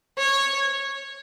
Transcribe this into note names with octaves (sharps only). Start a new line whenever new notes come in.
C#5